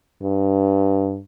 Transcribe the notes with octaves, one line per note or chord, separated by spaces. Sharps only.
G2